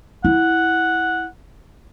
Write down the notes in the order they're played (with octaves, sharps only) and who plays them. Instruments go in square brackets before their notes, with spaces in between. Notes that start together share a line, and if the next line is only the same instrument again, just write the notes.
[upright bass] E4 [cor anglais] F#5